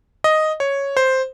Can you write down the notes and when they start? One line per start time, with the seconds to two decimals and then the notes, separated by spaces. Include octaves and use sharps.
0.24 D#5
0.60 C#5
0.97 C5